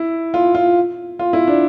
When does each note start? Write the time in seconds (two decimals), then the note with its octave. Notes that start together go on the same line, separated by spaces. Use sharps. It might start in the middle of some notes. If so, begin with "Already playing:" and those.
Already playing: E4
0.34 F4
0.55 F4
1.19 F4
1.33 E4
1.47 D4